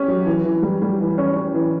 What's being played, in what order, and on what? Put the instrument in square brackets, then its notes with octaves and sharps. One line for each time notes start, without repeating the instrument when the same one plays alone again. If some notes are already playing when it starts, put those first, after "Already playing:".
Already playing: [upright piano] C#4 G4
F#3
E3
E3
G3
G3
E3
C#4
C#4
E3